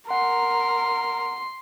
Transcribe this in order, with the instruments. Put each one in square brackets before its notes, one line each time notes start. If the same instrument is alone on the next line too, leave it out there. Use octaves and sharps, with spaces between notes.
[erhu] A#4 [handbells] F#5 [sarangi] C6